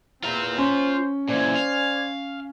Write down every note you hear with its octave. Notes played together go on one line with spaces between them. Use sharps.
E2 C4 F4 A#5
C#4 C5
A#2 E3 C5 D5 G#5
F5